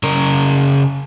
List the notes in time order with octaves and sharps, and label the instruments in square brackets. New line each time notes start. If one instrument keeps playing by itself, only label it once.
[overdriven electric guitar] C#3 A#4